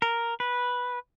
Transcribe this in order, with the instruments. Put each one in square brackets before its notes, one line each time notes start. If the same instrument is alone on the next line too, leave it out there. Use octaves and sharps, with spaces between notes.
[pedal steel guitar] A#4
B4